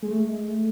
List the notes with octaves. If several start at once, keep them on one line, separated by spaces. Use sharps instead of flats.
G#3
A3
G#3
A3